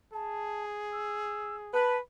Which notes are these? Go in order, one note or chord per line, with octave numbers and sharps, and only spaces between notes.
G#4 A5
E6
B4 A5